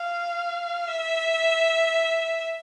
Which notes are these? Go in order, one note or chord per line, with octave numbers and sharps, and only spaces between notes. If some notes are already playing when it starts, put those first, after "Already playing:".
Already playing: F5
E5